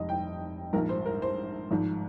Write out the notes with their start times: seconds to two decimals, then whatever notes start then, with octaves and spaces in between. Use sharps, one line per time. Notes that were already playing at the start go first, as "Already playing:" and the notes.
Already playing: F1 F2 C3 D#5
0.09 G5
0.73 A#1 G#2 F3 A#4
0.89 C5
1.05 A#4
1.22 C5
1.71 G#1 G#2 F3